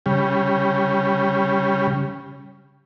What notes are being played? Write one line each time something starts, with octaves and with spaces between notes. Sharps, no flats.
C#3 G3